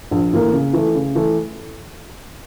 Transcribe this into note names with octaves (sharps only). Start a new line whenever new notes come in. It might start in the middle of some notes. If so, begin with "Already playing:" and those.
A#1
A2 E3 A#3
C#3
E3 A3
C#3
E3 A3